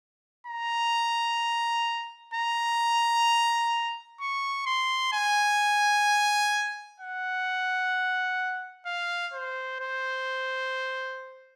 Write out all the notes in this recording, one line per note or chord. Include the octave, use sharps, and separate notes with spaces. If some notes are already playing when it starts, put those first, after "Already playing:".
A#5
A#5
C#6
C6
G#5
F#5
F5
C5
C5